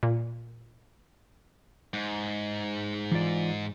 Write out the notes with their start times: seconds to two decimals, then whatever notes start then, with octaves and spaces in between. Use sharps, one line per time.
0.03 A#2
1.94 G#2
3.12 E3 F4 D5